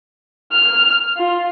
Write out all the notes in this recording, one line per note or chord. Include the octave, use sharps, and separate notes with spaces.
F6
F4